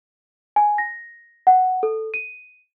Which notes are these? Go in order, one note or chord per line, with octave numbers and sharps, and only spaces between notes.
G#5
A#6
F#5
A4
D#7